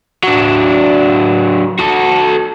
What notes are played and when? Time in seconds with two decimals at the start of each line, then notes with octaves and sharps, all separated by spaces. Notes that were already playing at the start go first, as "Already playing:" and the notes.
0.23 F#3 D4
1.79 F#4 A4